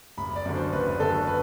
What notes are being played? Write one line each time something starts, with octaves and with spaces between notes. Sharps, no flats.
F#1 B5
D5
F#2 D3
C5
F#1 B4
F#2 D3 A4
B4